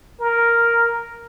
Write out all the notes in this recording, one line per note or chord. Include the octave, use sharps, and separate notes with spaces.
A#4